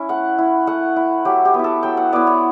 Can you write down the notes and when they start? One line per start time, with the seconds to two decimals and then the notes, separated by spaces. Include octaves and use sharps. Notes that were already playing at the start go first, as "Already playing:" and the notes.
Already playing: C#4 E4
0.09 A3 F#5
0.38 E4
0.67 A3 F#5
0.96 E4
1.25 F#3 G4
1.45 G4
1.54 B3
1.59 E4
1.64 A4
1.83 F#3 G5
1.97 F#5
2.12 B3 E4 D5
2.27 C#5